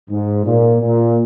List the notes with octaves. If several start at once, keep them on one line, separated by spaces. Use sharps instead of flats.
G#2
A#2
A#2